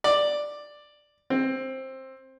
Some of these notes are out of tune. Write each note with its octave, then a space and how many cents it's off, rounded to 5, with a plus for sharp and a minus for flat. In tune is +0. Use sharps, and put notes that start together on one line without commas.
D5 +5
C4 +15